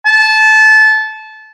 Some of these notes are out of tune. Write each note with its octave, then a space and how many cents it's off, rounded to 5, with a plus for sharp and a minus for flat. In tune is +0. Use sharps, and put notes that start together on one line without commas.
A5 -20